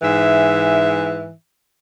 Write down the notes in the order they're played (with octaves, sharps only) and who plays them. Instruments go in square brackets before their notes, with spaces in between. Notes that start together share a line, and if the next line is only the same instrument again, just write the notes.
[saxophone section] G#2 E3 E5